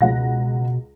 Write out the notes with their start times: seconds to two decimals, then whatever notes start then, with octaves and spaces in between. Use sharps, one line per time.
0.01 C#2 B2 F#5 A#6